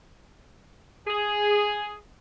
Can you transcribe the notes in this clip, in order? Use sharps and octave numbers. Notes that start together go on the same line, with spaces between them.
G#4